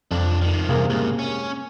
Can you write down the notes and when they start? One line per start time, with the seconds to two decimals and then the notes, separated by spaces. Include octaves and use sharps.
0.11 C2 F2 D4
0.42 D#3 F3
0.69 E2 G2 C3 A#3 G#4
0.90 C#2 G#2
1.19 C#4